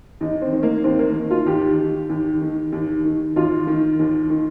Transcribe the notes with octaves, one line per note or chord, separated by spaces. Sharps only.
D#2 D#4
C4
D#3
A#3
D#2 C4
A#3
D#3
F4
D#2 G4
D#3
D#2
D#3
D#2
D#3
D#2 F4
D#3
D#2
D#3